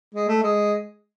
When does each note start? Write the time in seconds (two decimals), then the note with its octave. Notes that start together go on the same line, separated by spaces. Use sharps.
0.15 G#3
0.28 A3
0.43 G#3